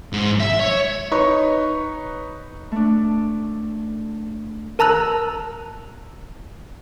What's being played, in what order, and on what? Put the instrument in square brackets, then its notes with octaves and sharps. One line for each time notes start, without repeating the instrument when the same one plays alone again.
[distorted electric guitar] G#2
E5
C#5
[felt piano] D#4 B4 C#5 C#6
[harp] A3 D4
[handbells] A#4 A5 A#5 E6 F#6